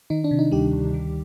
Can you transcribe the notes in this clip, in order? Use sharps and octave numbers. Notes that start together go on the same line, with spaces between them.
D#3 D#4
D4
C3
D#4
D2 G3 G4
D2
D#3